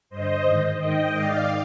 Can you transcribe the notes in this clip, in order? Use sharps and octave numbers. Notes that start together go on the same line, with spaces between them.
G2 D3 C5 D#5
G#2 D#3
G#2 D#3 D#5 G5
G#2 D#3 D5 F5